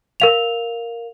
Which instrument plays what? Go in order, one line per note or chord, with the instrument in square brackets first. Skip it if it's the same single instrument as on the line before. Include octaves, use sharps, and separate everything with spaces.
[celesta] A#4 F5 F7